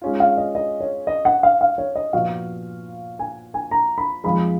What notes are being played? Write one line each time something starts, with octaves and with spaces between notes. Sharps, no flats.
G#3 C#4 F4
F5
D#5
D#5
C#5
D#5
F#5
F5
F5
C#5
D#5
A#2 F3 B3 F#4 F5
G#5
G#5
A#5
B5
F2 F3 G#3 B5